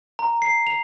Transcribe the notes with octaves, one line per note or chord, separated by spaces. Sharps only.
A#5
C7
F7